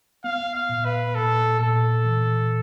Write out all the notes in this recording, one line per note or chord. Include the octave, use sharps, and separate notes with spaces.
B3 F5
F5
A#2
B4
A#2 A4
A#2 A4
E3